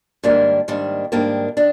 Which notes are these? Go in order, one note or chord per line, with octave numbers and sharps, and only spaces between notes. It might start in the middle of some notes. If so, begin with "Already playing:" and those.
G#2 D#3 G3 A#3 D4
G#2 D#3 G3 A#3 D4
G#2 D#3 G3 A#3 D4
D#3 D4